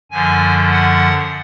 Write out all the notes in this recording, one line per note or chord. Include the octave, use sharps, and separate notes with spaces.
F#2 D3 F3 G#5
F#5